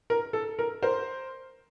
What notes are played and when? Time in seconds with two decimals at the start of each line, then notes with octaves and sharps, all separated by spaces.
0.10 A#4
0.33 A4
0.59 A#4
0.83 A#4 C5